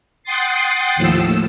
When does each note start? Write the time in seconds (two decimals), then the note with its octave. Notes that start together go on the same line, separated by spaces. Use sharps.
0.23 F#5 G5 C6 D#6 A6 C7
0.96 D#2 A2 F3 E6